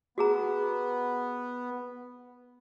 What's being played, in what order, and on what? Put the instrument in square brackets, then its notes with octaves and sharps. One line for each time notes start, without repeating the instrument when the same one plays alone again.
[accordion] B3 [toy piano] F#4 G#4 A#5